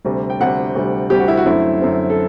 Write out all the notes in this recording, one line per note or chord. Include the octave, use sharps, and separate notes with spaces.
D2 C3 G3
G5
D2 C3 G3 F#5
D2 C3 G3
D2 C3 G3 G4
F#4
E4
F#4
F#2 D3 A3 C4 E4
F#2 D3 A3 C4
A4